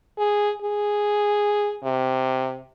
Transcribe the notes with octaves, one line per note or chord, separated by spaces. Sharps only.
G#4
G#4
C3